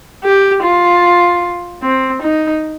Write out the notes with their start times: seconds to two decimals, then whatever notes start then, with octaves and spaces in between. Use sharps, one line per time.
0.24 G4
0.64 F4
1.83 C4
2.22 D#4